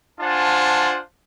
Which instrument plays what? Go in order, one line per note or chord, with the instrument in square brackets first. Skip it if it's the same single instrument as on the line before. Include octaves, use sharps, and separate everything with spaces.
[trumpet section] D4 F4 C5 F#5 G#5 A5